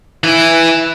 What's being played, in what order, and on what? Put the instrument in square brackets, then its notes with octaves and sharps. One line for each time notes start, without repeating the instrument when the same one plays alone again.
[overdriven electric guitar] E3 E4